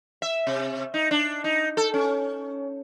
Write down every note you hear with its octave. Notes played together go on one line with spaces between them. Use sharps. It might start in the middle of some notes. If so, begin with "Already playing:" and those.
E5
C3
D#4
D4
D#4
A4
C#4